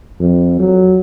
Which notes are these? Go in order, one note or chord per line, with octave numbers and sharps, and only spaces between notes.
F2
F#3